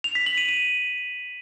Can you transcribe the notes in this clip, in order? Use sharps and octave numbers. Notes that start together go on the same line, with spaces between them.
F7
B6
F#7
D#7
D#7